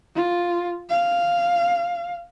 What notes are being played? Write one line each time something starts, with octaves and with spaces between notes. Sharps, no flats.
F4
F5